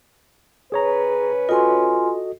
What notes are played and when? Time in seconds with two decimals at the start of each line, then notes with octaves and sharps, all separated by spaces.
0.72 C#3 C#4 G#4 B4 C#5 A#5
1.49 F4 F#4 A4 D#5 G#5 C6